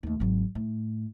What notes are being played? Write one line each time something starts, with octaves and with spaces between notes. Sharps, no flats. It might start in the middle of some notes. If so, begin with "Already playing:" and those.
D#2 A3
G#1 F#3
A2